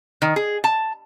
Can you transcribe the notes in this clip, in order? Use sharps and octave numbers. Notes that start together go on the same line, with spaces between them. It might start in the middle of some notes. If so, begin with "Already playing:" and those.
D#3
G#4
A5